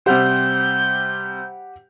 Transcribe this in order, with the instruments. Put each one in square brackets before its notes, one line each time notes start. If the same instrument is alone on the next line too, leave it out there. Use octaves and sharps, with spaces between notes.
[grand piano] C3 G3 C5 [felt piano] G4 F#5 [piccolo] G6